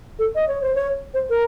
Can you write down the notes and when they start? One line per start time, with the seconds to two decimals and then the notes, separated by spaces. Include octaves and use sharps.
0.19 A4
0.35 D#5
0.48 C#5
0.62 C5
0.75 C#5
1.14 C5
1.30 A#4